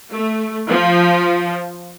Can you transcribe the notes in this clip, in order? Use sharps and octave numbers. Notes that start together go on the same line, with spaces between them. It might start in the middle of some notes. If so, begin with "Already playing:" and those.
A3
F3